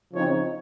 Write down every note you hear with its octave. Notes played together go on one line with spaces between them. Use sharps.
C#3 F3 C4 D#4 C#5